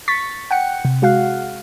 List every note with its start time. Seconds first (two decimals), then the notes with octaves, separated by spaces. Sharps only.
0.08 C#6 A6 B6
0.51 F#5 G5 C#7
0.85 C3
1.02 G#3 F#4 F5 F#5